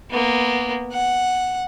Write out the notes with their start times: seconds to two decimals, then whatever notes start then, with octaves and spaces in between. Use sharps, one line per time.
0.10 A#3 B3
0.92 F#5